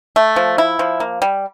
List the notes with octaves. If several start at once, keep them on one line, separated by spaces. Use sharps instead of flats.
A3
F3
E4
F3
A#3
G3